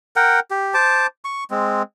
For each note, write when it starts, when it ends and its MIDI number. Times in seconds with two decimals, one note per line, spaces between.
0.16 0.40 70
0.16 0.40 78
0.16 0.40 79
0.51 0.74 67
0.74 1.07 72
0.74 1.07 81
0.74 1.07 86
1.25 1.44 85
1.51 1.82 56
1.51 1.82 60